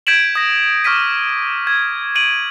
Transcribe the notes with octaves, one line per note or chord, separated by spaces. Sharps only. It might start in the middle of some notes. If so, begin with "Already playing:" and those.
G6 G#6 B6 D7 E7 F#7
D#6 A#6
C#6 D6 F6 A#6 B6 D#7
G#6
D7 D#7 F#7